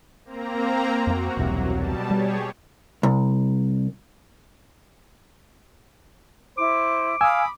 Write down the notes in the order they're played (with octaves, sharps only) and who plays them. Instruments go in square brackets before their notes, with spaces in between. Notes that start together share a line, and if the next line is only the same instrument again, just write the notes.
[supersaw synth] A#3 C4 A#5
[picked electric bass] F2 A#3 [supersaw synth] F#4
[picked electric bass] E1 C2 C3 [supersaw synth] F#3
[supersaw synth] B2 G3 A5
[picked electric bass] G3 [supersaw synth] G4 G#4 C#5
[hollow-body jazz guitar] C2
[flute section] E4 [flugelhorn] C5 [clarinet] D6
[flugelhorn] F5 [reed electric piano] G#5 E6 [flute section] B5 D#6